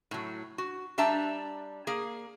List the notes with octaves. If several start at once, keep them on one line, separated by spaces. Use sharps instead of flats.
A2 F#3
F#4
G3 D4 E5 A5 A#5
A#3 G#4